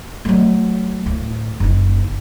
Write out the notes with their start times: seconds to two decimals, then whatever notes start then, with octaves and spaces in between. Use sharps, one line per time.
0.25 F#3 A3
1.06 D2 A2
1.60 F#1 D#4